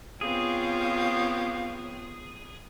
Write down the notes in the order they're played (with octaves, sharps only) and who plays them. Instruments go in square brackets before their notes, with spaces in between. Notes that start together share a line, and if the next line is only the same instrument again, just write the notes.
[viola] B3 C4 [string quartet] F4 G4 C#5 [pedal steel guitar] G#4 [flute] F5